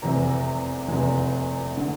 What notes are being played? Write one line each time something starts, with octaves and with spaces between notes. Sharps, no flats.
F1 E2 C3 E3 A#5
F1 E2 C3 E3
D3